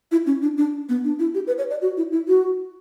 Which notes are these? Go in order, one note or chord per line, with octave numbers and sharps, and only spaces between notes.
E4
C#4
D4
D4
B3
D4
E4
G4
B4
C#5
D5
F#4
E4
E4
F#4